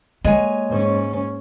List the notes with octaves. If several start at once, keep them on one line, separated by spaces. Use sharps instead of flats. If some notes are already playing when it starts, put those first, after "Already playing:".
G#3 A#3 C#5 G#5
G#2 C#4